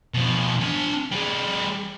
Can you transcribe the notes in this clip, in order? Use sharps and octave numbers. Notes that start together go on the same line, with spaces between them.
B2 F3
D4 G#5
G3 G#4